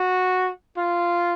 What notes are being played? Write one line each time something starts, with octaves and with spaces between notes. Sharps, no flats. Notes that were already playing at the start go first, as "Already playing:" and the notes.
Already playing: F#4
F4